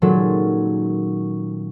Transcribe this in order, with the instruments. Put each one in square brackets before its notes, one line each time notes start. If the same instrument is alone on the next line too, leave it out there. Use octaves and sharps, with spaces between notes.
[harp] A#2 D#3 F#3 G#3 C#4 A4